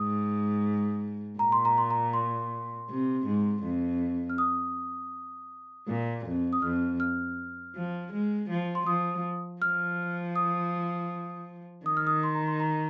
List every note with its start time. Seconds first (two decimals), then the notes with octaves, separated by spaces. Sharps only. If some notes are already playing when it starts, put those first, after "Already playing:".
Already playing: G#2 D#6
1.39 A#2 A#5
1.52 C6
1.65 A#5
1.78 C6
1.90 A#5
2.13 C6
2.89 C3
3.26 G#2
3.63 F2
4.30 F6
4.38 D#6
5.87 A#2
6.26 F2
6.53 D#6
6.62 F2 F6
7.00 F6
7.75 F3
8.13 G#3
8.49 F3
8.75 C6
8.86 F3 D#6
9.62 F3 F6
10.36 D#6
11.86 D#3 D#6
11.97 F6
12.07 D#6
12.23 C6
12.35 A#5
12.47 C6
12.60 A#5